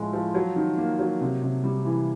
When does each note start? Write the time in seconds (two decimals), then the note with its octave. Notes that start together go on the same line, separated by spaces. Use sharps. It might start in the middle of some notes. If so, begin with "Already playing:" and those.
Already playing: A2 F3 G#3
0.13 F3
0.35 F#3
0.56 D#3
0.77 A#3
0.99 F#3
1.21 C3
1.42 C3
1.64 G3
1.85 E3